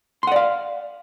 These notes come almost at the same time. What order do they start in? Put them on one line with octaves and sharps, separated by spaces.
C6 F#5 D5 F5